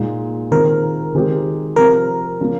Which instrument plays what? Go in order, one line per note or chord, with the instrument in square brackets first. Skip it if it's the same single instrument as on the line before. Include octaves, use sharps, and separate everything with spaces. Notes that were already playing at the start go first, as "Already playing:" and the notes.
Already playing: [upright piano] A#2 G#3 D#4
[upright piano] D#3 G#3 C4 F4 [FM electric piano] A#4
[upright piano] D#3 G#3 C4 G4
[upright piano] C3 F3 C4 [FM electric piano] A#4
[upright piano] C#3 F3 A#3